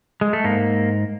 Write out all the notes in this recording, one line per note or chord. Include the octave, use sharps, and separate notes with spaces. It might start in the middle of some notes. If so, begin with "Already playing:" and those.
G#3
A3
G#2 A#3